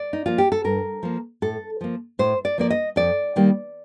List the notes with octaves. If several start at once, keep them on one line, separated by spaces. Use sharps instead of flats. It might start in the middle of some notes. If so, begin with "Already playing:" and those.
Already playing: D5
D#4
F3 A#3 F4
G4
A4
G2 A#4
F3 A#3
A2 A4
F3 A#3
A2 C5
D5
F3 A#3 D5
D#5
F2 D5
D#3 G3 A#3